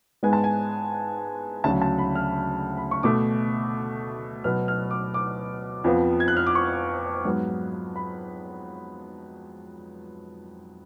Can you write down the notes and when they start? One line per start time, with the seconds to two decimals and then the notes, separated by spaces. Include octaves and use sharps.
0.23 G#2 G#3 B3 G#5
0.33 A5
0.44 G#5
1.64 D2 C#3 F#3 A5
1.82 A5
1.98 B5
2.15 F6
2.77 B5
2.91 C#6
3.03 B2 A3 D6
4.44 B2 F#3 B3 F6
4.68 F6
4.91 D6
5.14 D6
5.84 F2 F3 B3
6.20 G#6
6.28 F#6
6.37 F6
6.47 D6
6.55 C#6
7.25 G#2 F#3 B3
7.96 B5